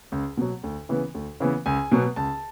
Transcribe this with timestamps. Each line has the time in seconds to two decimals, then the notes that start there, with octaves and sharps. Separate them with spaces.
0.12 C#2
0.37 B2 F#3
0.63 D2
0.89 C#3 E3 B3
1.14 D2
1.40 C#3 E3 B3
1.66 C#2 G#5
1.92 B2 F#3 B3
2.16 C#2 A5